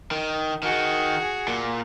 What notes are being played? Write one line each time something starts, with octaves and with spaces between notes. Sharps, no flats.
D#3
D#3 F#4 G#4
A#2